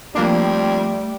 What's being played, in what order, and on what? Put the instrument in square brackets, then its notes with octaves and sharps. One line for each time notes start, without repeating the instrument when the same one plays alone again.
[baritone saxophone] F2 [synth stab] F3 A#3 D4 [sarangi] G3 [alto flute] A3